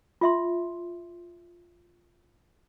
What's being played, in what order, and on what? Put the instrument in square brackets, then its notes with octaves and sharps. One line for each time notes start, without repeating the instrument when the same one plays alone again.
[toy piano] F4 E5 C6